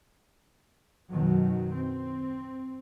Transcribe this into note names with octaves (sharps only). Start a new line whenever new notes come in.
F#2 B2 D#3 F#3
C4